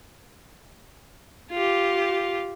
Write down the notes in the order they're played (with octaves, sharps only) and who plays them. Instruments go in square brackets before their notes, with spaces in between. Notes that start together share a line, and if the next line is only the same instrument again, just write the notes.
[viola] F4 G4